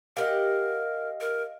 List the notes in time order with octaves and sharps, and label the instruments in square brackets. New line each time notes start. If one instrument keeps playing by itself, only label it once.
[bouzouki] G4 F#5 [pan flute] A#4 [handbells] D#5 F5
[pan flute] A#4